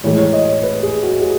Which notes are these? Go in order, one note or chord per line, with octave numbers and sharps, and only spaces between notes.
A2 E3 G#3 C#5
C#5
D#5
C#5
B4
G#4
F#4
G#4